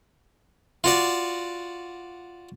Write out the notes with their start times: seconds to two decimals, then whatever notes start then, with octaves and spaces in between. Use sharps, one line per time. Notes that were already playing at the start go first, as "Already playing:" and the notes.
0.84 F4 F#4 D5